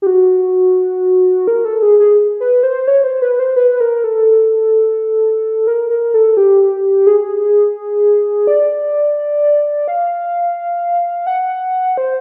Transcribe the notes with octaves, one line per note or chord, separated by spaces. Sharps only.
G4
F#4
A#4
A4
G#4
G#4
B4
C5
C#5
C5
B4
C5
B4
A#4
A4
A#4
A#4
A4
G4
G#4
D5
F5
F#5
C5